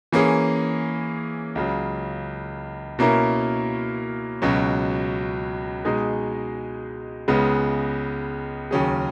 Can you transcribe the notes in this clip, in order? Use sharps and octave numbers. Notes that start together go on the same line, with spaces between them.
E3 A#3 C#4 G#4
C#2 C#3 F#3
B2 A#3 C#4 E4 A#4
C#2 B2 F#3 C#4
B2 G#3 D#4 G#4
C#2 C#3 G#3 B3
D#2 C#3 F#3 C#4 G#4